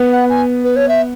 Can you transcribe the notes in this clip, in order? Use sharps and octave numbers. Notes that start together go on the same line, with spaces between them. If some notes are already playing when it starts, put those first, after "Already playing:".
Already playing: B3
F#5
G#5
B4
C#5
E5